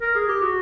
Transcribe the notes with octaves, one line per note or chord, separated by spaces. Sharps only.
A#4
G#4
G4
F#4